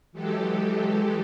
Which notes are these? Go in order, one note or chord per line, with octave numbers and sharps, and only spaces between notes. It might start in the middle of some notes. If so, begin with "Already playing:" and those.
E3 F#3 G#3 G4 A4